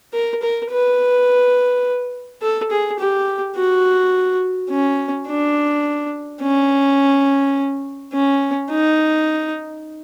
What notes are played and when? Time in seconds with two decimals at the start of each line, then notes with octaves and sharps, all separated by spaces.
0.14 A#4
0.42 A#4
0.71 B4
2.42 A4
2.71 G#4
3.00 G4
3.57 F#4
4.70 C#4
5.28 D4
6.42 C#4
8.13 C#4
8.71 D#4